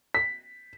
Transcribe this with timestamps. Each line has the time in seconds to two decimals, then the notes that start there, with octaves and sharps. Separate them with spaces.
0.14 B6